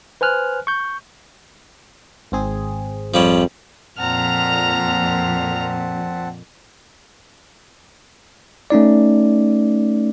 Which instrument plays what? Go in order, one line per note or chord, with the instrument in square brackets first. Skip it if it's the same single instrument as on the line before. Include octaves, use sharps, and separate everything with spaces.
[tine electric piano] B4 C5 G#5 F6 F#6
C#6 G6
[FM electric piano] G#1 C4 G#4
[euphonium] F2 [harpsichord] F3 G3 C#5
[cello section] F2 A#2 [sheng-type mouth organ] C4 F#5 A5 [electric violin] A#5 F6
[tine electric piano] A3 C#4 D#4 D5